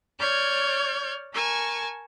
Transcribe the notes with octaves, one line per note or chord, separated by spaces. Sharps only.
C#5 D5 F6 G6 G#6
A#4 G#5 A5 C#6